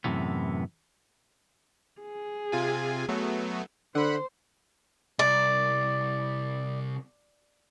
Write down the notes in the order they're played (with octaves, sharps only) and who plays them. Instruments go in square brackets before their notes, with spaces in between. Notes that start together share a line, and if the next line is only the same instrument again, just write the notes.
[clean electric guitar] F#2 A2 C3 E3 B3
[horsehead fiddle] G#4
[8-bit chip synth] C3 F4 G#5
F#3 A3 B3
[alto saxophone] D3 [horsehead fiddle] C5 [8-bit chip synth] F#5 B5
[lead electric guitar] C2 [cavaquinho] D5